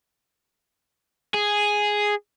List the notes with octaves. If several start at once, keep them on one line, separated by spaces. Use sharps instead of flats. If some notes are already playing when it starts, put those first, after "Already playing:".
G#4